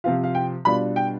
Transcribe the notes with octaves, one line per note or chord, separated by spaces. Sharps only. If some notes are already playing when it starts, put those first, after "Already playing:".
C3 F3 C4 F4 F5
F5
G5
B2 G3 D4 F4 B5
G5